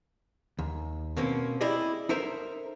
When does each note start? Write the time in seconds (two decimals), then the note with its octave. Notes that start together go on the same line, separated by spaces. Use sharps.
0.59 D#2
1.17 B2 A#3 C4 C#4
1.61 E4 G4 G#4 D5 D#5
2.09 D#4 A4 A#4 C5 E5